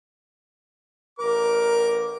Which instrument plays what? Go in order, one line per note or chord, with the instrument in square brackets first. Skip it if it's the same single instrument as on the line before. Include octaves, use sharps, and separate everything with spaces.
[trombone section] A1 A#4 [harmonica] D6